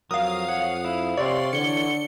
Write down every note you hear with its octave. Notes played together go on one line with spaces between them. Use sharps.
F2 F#3 A#4 F5 D#6
C#5 F#5
E4
C3 C#5 D5 F5 C6
D3 E3 C#5 C#7 G7